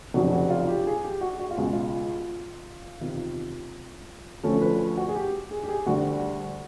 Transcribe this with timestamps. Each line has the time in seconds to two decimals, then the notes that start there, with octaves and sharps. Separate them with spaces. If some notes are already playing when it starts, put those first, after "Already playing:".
0.14 F1 F2 C#3 F#3 F#4
0.33 F#4
0.50 F4
0.68 G4
0.87 G#4
1.04 G4
1.21 F#4
1.39 F#4
1.51 F4
1.57 C#2 B2 G#3
1.73 F4
3.00 E2 C3 D#3 F4
4.44 D2 D3 F3 A3 C#4 A4
4.61 B4
4.97 F#4
5.09 G#4
5.15 G4
5.51 G#4
5.64 G4
5.69 G#4
5.86 D2 D3 G3 F#4